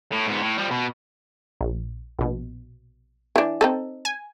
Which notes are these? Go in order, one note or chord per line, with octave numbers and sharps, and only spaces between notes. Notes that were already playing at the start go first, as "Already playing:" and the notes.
A2
G#2 B3
A2
F3 G3
B2
A#1
A#1 B2
E3 D4
C4 D#4 A4
G#5